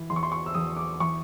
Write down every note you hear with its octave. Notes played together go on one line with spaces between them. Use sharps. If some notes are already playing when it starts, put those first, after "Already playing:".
Already playing: E3
E2 C6
C#6
C6
C#6
E6
E2 D#6
D6
E3 C#6